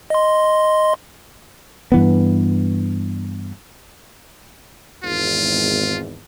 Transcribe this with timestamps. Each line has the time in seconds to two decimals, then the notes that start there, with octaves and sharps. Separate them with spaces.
0.10 D#5 C6
1.92 G2 E3 B3
5.04 G#1 E2 G#2 F4